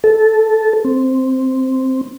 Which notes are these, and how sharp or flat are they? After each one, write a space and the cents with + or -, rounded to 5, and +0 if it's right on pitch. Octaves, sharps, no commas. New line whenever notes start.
A4 -10
C4 +0